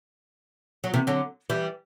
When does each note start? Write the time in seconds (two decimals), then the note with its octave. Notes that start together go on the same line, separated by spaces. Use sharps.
0.84 F#3
0.94 C3 E3
1.07 D3 F#3
1.50 E3 G3